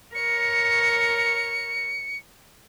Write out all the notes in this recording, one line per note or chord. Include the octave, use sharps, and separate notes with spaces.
A#4 C#5 C#7